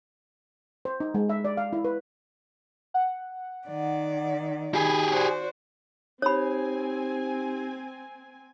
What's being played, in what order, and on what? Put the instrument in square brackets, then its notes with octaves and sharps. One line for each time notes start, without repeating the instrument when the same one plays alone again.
[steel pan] C5
D#4
G#3
E5
D5
F5
E4
B4
[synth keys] F#5
[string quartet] D#3 D5
[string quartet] D#3 [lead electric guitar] G4 G#4 [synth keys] B5 G#6
[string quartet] F#4 C5 D5
[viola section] C4 G#5 [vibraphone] D#4 G4 C5 [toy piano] C#5 B5